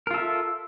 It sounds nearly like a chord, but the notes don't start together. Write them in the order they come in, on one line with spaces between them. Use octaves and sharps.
A#4 F4 A4 E5